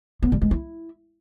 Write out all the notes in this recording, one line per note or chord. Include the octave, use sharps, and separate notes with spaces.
B3
G3
G#3
E4